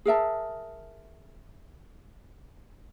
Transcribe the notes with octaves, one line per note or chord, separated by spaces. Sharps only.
G#4 A#4 E5 A5